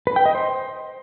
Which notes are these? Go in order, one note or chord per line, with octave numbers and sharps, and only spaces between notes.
B4
G5
D#5
C5